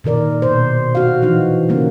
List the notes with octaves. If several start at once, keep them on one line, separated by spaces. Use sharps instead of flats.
A#2 D#3 A#4 D5
B2 C5
F#4 F5
E3 F3 D#4
C#3 G3 A#3 C#4